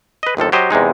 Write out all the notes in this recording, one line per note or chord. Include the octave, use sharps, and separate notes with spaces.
B4 D#5
G1 D#2 F3 A4
F#3 G4 C5 D#5
E2 C3 G#3 D#4